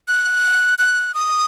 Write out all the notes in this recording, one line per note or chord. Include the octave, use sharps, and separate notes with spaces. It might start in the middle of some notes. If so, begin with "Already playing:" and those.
F#6
F#6
D#6